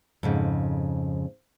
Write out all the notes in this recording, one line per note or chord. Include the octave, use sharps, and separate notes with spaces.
F2 G#2 C#3